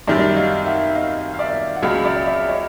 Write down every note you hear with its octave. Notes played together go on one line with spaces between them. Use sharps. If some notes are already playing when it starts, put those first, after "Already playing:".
F#2 D#3 G3 D5 E5
D#5 F5
E5 F#5
D#5 F5
F5
D5 E5
F#5
C#2 C#3 F#3 D#5 F5
D5 E5
D5 E5
C#5 D#5